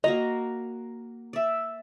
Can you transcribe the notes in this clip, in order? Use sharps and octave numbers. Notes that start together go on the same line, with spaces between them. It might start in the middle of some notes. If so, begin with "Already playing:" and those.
A#3 F#4 D#5 A#5
D5 E5